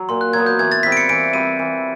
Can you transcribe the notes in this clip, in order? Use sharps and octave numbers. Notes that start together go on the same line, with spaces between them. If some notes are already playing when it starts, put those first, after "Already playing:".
Already playing: F#3
A#2 C6
F#6
F#3 B3 G#6
G6
E3 G#6
A6
G3 C4 F4 B6
D7
C#7
E3 D7
G3 C4 F4 D#7
E3